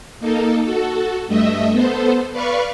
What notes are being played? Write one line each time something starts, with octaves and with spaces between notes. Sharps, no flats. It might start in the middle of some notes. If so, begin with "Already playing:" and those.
A#3 D#4 A4
F#4 A4
G2 A3 D#5 E5
B3 A4 C5
B4 D5 F5 B5 C#6